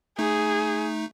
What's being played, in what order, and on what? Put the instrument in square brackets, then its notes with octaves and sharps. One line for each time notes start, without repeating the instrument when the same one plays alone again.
[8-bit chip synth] A3 D#4 [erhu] G#4